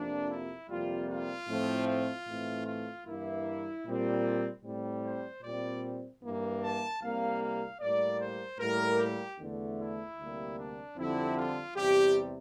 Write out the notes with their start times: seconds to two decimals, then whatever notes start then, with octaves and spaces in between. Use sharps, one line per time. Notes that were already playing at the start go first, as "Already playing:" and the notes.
Already playing: F2 C3 F3 A#3 D4
0.30 E4
0.69 F2 C3 G3 A#3 F4
1.09 F4
1.48 A2 F3 A3 C4
1.88 F4
2.27 A2 E3 A3 C4
2.66 F4
3.06 G2 E3 A#3 E4
3.86 A#2 G3 C4
4.64 A2 G3 C4
5.03 C5
5.43 A#2 G3 C4 D5
6.22 G2 E3 A#3
6.62 A5
7.01 C2 C3 G3 A#3 F5
7.41 F5
7.80 A2 G3 A#3 D5
8.20 C5
8.59 A2 G3 A#3 A#4
8.99 G4
9.38 E2 D3 A3
9.77 E4
10.17 D2 C3 G3 A#3
10.56 D4
10.96 F2 D3 G3 C4 E4
11.36 F4
11.76 E2 C3 G3 G4